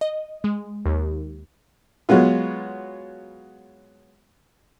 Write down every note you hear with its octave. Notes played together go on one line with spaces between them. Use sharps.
D#5
G#3
D#2
F#3 G#3 B3 F4